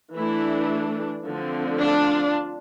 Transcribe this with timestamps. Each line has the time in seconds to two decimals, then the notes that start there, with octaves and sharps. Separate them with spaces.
0.15 E3 A3 D4 E4
1.25 D3 F3 A3 C4
1.80 D4 F4